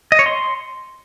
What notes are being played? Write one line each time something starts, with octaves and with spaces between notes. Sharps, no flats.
D#5
C#5
C6